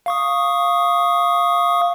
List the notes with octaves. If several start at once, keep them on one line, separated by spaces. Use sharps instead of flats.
F5 C#6 D#6